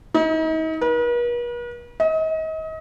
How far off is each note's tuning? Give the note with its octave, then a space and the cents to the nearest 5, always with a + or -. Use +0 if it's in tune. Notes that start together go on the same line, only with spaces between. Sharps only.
D#4 +40
B4 -45
D#5 +35